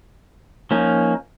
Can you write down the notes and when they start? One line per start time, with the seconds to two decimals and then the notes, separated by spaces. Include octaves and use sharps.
0.71 F3 A#3 C#4 D#4